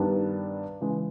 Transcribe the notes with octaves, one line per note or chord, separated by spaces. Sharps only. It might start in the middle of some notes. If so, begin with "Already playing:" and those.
Already playing: G2 D#3 G3 B3 D4
C#3 E3 G#3